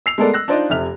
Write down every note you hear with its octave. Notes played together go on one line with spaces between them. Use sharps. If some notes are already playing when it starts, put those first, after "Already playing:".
E6 C7 F7
G#3 A3 B3 A4 A#4 D5
E6 F#6 A#6
D4 D#4 F4 C5 D5 D#5
F1 C3 E5 F6 F7